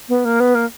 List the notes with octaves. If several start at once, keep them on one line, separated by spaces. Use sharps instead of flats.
B3
A#3
B3
A#3